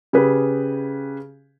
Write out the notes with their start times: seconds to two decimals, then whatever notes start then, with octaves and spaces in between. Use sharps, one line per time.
0.13 C#3 G4 G#4 B4